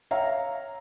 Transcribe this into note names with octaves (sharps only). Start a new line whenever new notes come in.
C#5 E5 F5 A#5